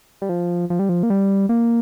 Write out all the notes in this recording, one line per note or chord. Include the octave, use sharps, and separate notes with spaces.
G3
F3
F3
G3
F3
A#3
G3
A#3